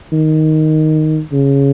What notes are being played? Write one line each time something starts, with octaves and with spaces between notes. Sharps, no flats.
D#3
C#3